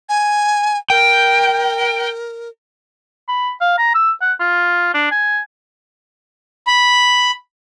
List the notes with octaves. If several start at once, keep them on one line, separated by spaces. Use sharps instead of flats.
G#5
A#4 G5
B5
F5
A#5
E6
F#5
F4
D4
G#5
B5